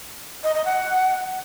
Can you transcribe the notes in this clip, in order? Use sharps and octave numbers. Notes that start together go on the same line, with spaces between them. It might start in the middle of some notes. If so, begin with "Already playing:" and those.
D#5
D#5
F#5